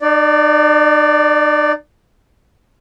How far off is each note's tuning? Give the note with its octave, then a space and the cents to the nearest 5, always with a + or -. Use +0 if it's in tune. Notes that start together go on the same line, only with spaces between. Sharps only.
D#4 -45 D5 +0